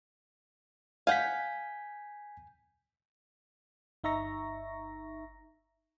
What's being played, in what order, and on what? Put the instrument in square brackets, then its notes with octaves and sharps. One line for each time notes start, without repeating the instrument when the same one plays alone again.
[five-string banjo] F5 F#5 [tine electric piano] G#5 G6 B6
[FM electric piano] G1 D#4 E5 A#5 C#6 A#6